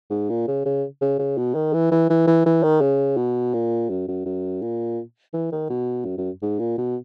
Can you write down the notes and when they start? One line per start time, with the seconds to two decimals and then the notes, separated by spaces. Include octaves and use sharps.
0.11 G#2
0.30 A#2
0.48 C#3
0.66 C#3
1.02 C#3
1.19 C#3
1.38 B2
1.55 D#3
1.74 E3
1.92 E3
2.10 E3
2.27 E3
2.46 E3
2.64 D#3
2.82 C#3
3.17 B2
3.54 A#2
3.90 F#2
4.08 F#2
4.26 F#2
4.62 A#2
5.34 E3
5.52 D#3
5.70 B2
6.05 F#2
6.18 F#2
6.43 G#2
6.60 A#2
6.78 B2